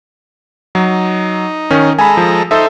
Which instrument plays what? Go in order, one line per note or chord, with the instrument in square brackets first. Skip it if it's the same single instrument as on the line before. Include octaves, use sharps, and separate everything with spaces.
[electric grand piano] F#3 [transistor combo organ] D#4
[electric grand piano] D#3 C#4
[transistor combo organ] G#3 A4 A#5 [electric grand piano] G#5 B5
[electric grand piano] F3
[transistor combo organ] D#4 C5 [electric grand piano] A4 E5